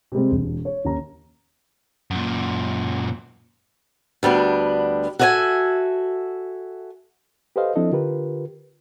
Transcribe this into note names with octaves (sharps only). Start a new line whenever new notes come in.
C3 G3 G#3 C4
E1
C#5
D#2 C#4 A#5
F#2 A#2
D2 G3 B3 D4
F#4 A4 C#5 D#5 E5 G#5
G4 A4 B4 C5 D#5 F5
F3 C4 D4 E4 A4 D#5
D3 F4 G4 A#4 B4